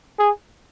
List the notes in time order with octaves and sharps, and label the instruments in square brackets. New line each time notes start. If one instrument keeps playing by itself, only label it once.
[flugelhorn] G#4